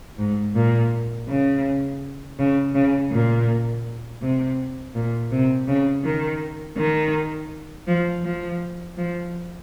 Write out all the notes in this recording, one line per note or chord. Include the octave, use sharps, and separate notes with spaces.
G#2
A#2
C#3
C#3
C#3
A#2
C3
A#2
C3
C#3
D#3
D#3
F3
F3
F3